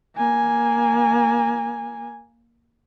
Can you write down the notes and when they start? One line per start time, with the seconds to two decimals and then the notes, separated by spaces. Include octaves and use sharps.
0.17 A#3 G#5